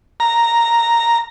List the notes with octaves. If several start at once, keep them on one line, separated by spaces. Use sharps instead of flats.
A#5